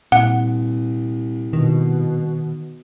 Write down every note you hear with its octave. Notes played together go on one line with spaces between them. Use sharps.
C2 A#2 F#5
B2 D#3